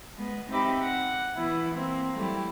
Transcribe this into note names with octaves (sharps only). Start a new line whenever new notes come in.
G#3 B3
C4 D#4 G4 E5 B5 D6
F#5
E3 B3 E4
A#3 C4
F#3 G3 A3 E4 G4